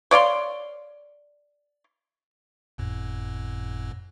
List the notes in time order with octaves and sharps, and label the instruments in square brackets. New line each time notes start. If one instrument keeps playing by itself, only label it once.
[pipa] C#5 D5 F5 C6
[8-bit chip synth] G1 F2 A2